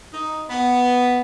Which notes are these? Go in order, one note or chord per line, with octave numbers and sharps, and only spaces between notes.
D#4
B3